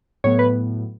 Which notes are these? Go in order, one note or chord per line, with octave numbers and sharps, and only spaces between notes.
A2 F#3 B3 C#5
B4